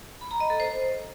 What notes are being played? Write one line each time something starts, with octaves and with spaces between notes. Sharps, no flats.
B5
A#5
D#5
A4
C5